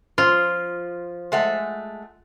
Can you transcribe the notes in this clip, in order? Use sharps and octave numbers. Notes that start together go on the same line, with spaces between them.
F3 F4
G#3 A3 F#5